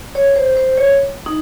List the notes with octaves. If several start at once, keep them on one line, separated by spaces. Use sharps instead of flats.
C#5
C5
C5
C#5
D#4